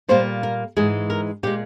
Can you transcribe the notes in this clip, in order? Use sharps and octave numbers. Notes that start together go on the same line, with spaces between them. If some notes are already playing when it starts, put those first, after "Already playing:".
A#2 G3 A#3 C5
A#4
G#2 E3 G#3 G#4
A#4
A#2 G#3 G4